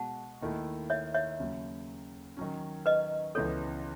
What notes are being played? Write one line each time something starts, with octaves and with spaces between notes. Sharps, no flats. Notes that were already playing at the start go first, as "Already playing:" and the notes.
Already playing: B2 G#3 F#4 F#5 A5
D#2 D#3 A3 E4
C#5 E5
C#5 E5
D#2 C#3 F#3
D#3 F#3 C#4
B4 D#5
C#2 C#3 E3 B3 A4 C#5